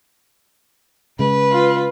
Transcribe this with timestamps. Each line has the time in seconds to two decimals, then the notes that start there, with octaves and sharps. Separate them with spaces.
1.19 C#3 G#3 B4
1.52 F4